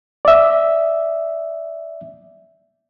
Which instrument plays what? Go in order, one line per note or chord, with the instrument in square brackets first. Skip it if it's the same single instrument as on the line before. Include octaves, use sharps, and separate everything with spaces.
[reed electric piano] D5 E5